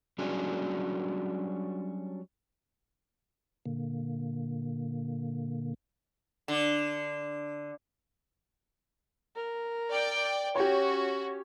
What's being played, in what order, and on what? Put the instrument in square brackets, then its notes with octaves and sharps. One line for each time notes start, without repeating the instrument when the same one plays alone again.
[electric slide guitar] F#3 G3 C#4 D4 F#4 G#4
[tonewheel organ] A#2 D3 A#3
[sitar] D3
[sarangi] A#4
[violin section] D5 G5
[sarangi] C#4 [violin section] F#4 [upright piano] G4 C#5